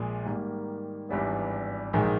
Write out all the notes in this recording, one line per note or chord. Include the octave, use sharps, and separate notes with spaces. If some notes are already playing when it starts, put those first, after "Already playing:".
Already playing: A#1 A#2 G#3
G#2 D#3 G3 A#3
G#1 G2 E3 G3 B3
A#1 G#2 D#3 G#3